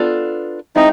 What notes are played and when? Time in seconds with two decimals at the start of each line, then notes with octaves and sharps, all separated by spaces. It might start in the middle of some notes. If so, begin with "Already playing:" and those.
Already playing: B3 D4 F4 A4
0.76 G#3 C4 D#4 E4